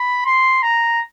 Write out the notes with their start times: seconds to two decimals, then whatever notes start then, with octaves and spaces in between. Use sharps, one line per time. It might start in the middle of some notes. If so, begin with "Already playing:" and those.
Already playing: B5
0.26 C6
0.62 A#5